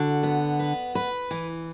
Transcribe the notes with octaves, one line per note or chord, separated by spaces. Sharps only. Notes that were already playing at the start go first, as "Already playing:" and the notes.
Already playing: D3 F#4
B3
B4
B4
E3